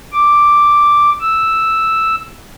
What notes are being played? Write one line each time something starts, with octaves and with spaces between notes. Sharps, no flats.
D6
E6